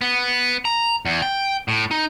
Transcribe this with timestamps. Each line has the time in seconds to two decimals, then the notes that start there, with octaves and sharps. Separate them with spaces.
0.01 B3
0.65 A#5
1.05 E2
1.22 G5
1.68 A2
1.91 D#4